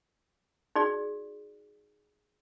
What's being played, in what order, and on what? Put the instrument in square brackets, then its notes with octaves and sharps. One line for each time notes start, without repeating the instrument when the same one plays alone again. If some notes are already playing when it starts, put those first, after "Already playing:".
[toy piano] D#4 F#4 G#4 D5